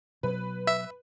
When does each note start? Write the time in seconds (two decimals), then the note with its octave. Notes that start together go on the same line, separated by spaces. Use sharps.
0.23 B2 F#3 B4
0.67 E5